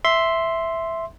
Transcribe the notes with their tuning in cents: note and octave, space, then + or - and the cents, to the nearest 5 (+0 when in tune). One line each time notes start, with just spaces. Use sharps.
E5 +0 C6 +0